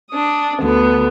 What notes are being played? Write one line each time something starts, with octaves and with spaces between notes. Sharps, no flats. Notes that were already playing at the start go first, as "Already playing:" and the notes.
D4 D#6
D2 D3 B3